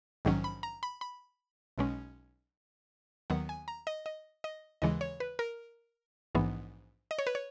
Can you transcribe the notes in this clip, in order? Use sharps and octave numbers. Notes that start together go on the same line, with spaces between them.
A#1 G#2 D#3 F#3 C#4
B5
A#5
B5
B5
B1 B2 G#3 C#4
D#2 D#3 F#3 B3 F#5
G#5
A#5
D#5
D#5
D#5
D#2 C#3 E3 G#3 D#5
C#5
B4
A#4
A#1 G#2 E3 B3
D#5
C#5
B4
C#5